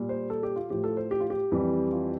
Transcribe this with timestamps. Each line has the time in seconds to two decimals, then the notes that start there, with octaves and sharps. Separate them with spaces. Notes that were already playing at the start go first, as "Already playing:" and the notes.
Already playing: A#2 G3
0.09 C5
0.30 A4
0.43 G4
0.56 F4
0.70 A2 F3 G4
0.84 A4
0.97 C5
1.11 G4
1.20 F4
1.30 G4
1.52 F2 E3 G3
1.92 F4